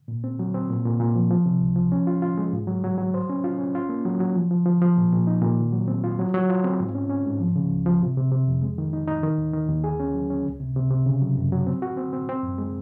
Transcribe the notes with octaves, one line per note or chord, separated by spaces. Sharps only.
A#2
C4
F#3
C4
A#2
A#2
A#2
F3
F3
C3
C#2
F3
C#4
F4
F4
G#3
G#2
F#3
F#3
F#3
C5
C#4
F4
C#4
F4
A#3
F#3
F#3
F3
F3
F3
F3
A#2
A#2
D#4
A#2
D#3
F#3
C4
F4
F#3
F#3
F4
C4
G#2
C#4
C#4
G#2
F3
C#3
C#2
F3
C3
C3
C3
F2
G#3
D#3
D#4
D#4
D#3
D#2
D#3
D#2
G#4
C#4
F#3
C#4
C#2
C3
C3
C3
C#3
F#3
F#2
F#3
C4
F#4
C4
C4
C4
F#2
G#3